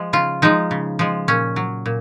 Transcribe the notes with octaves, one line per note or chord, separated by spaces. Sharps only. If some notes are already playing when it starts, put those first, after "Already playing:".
Already playing: F3 G#3
C#3 F4
F3 G#3 D#4
C#3
F3 G#3
A#2 C#4
F#3
A#2